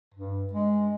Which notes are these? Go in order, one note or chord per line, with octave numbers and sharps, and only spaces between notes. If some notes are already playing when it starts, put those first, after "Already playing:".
G2
G#3